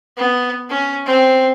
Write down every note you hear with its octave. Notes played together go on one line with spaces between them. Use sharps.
B3
C#4
C4